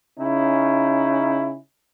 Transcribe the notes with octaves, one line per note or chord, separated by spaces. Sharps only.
C#3 C#4 D#4 E4